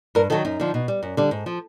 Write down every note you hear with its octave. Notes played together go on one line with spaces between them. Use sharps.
G2 A#4
D#3 F#3 A4
F#2 D#4
D3 F3
B2
G3
F#2
D3 G3
G#2
F3